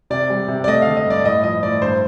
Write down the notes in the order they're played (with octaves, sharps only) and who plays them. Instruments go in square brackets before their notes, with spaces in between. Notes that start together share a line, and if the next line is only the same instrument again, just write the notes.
[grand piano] C3 D5
G3
C3
D5
A3 D#5
D3 F5
D#5
G2 D5
A2 D#5
F3 D#5
A2 D5
G2 C5